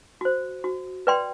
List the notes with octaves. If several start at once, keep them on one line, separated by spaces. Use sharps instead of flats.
F#4 C5
F#4
B4 D5 G5 C6